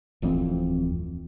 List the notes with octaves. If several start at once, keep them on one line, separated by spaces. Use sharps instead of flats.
D1 F2 E3 C4